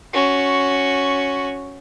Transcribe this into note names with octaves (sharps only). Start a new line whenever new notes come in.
C#4 F#4